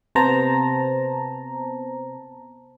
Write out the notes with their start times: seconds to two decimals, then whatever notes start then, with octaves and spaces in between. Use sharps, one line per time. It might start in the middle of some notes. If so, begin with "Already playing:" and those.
0.15 C3 B3 C5 A5 A#5